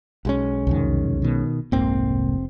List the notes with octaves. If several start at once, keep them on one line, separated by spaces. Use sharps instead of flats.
B1 G#3 C#4
C2 F2 D#3
B2 D#3
F1 C2 G#2 A#3 C4